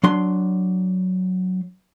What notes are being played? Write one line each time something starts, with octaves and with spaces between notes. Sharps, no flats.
F#3 D4 C6